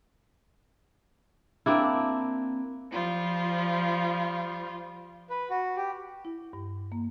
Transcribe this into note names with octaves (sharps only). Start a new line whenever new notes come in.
A#3 C4 D4 E4
F3 G3 F4
B4
F#4
G4
E4
G2
A#3